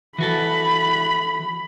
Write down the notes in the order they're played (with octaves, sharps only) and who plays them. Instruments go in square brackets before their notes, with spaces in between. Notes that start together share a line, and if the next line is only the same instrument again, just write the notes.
[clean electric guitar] E3 F#4 A4 [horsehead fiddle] B5